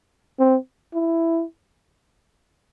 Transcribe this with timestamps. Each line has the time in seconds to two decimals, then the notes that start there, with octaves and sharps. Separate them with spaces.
0.39 C4
0.94 E4